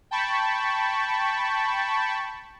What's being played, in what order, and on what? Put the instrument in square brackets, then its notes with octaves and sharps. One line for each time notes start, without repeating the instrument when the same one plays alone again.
[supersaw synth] G5 A5 B5 C#6